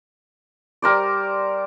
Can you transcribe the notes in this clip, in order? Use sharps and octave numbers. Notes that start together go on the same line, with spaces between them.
G3 A#4 C5 D5